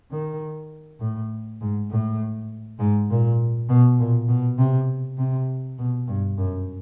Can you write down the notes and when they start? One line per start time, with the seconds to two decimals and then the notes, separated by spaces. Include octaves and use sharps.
0.11 D#3
1.00 A2
1.61 G#2
1.90 A2
2.79 G#2
3.10 A#2
3.69 B2
3.99 A#2
4.29 B2
4.58 C3
5.18 C3
5.78 B2
6.07 G2
6.37 F#2